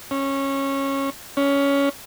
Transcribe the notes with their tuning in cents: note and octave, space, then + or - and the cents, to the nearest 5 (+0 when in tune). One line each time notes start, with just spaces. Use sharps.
C#4 -15
C#4 +15